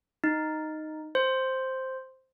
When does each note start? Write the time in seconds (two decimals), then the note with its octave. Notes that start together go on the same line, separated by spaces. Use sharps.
0.24 D#4
1.15 C5